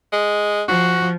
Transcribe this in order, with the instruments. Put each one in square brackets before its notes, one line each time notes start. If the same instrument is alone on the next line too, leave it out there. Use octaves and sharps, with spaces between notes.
[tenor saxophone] G#3
[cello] F3 [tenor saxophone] F#4